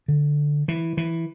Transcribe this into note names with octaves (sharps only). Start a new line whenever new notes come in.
D3
E3
E3